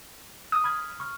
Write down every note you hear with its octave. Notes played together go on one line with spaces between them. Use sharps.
D#6
B5 F6 G#6
C#6 F6